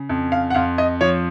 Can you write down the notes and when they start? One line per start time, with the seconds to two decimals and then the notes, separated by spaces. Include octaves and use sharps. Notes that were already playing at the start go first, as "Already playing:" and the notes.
Already playing: C#3
0.09 F2
0.32 F5
0.50 F#5
0.55 F2 F5
0.78 D#5
1.01 F3 C#5